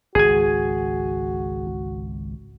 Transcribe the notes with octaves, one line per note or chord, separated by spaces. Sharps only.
G#1 C#2 F#4 G#4 G#5